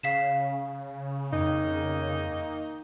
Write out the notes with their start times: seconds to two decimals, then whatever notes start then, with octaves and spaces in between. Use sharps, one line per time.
0.03 C#3 F5 B6 E7
1.33 F2 D#3 A#3 D#4